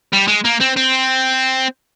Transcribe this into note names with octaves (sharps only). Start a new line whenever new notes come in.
G3
G#3
A#3
C4
C4